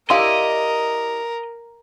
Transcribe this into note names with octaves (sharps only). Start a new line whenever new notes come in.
E4 G4 A#4 D5 D#5 F5 C6